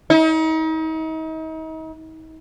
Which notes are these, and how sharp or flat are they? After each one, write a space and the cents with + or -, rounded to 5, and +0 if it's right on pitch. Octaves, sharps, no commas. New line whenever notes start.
D#4 +40